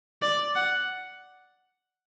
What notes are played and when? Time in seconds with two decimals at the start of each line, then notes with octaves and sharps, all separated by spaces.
0.22 D5
0.55 F#5